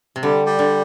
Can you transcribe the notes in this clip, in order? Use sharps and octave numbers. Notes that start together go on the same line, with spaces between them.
C3
D3 G3
G3
D3